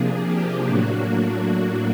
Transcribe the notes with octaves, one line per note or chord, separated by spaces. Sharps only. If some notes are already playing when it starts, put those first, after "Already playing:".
Already playing: C3 F3 A#3 D4 G#4
G4
A2 F#3 A#3 D4 F#4
F#4